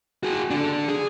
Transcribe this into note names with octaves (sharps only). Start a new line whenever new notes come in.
F#4 G#4
D3 D4
G#4